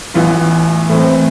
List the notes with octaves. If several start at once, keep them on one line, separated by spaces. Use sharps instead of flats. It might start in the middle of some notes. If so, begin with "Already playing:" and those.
A1 A2 E3 B3 F4
A2 E3 A3 C4